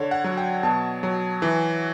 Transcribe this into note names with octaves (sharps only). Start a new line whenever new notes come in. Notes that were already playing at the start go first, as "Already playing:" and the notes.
Already playing: D3 C#5
F#5
F#3
G5
B2 A5
F#3
E3